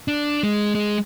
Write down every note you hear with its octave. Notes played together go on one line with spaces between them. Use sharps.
D4
G#3
G#3